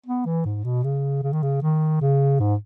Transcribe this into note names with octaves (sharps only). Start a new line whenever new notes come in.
B3
E3
G#2
B2
C#3
C#3
D#3
C#3
D#3
C#3
G#2